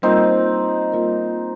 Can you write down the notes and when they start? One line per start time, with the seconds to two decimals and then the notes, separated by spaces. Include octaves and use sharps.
0.02 G3 A#3 C4 D#4 F4 A#4
0.93 G3 A#3 F4 A#4